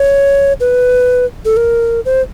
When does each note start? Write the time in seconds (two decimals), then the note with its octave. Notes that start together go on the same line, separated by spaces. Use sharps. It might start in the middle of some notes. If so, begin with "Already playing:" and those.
Already playing: C#5
0.60 B4
1.45 A4
1.57 A#4
2.05 C5